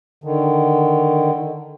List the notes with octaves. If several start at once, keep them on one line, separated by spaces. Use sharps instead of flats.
D3 D#3